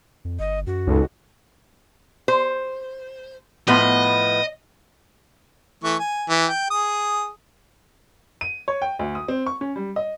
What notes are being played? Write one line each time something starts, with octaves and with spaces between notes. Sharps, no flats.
F2
G1 D#5
F#2 F#4
C#2 D#4 A4
C5
A2 F3 B3 D#5
E3 A3 C#6
G#5
E3
G5
G#4 D#6
D#7
C#5
G5
D2
D#6
C4
C#6
C#4
G3
D#5